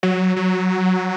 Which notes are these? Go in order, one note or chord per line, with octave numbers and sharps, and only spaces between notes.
F#3
F#3